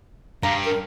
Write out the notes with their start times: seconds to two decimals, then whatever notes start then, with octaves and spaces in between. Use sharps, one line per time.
0.43 G2 F5 A#5
0.65 A#4